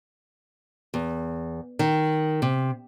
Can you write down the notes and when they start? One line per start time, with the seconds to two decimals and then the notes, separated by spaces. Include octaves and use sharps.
0.94 E2
1.79 D#3
2.42 C3